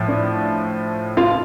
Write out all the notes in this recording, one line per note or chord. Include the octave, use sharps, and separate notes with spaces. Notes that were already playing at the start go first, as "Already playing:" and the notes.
Already playing: A2 F3
D4 D5
F4 F5